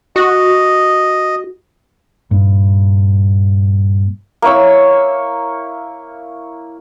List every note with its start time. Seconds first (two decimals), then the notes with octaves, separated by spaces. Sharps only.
0.16 F#4 D#5
2.31 G2 A#2
4.42 A#3 E4 C#5 E6